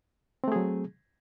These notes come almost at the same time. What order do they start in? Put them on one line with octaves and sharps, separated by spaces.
C4 A3 G#4 F#3